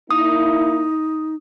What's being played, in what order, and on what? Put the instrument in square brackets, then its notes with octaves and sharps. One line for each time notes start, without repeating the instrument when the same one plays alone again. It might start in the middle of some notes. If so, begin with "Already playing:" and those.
[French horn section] A#3 E4 [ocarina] D#4 [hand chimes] D#6